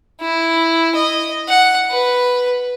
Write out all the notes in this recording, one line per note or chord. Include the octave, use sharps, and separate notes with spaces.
E4
D#5
F#5
B4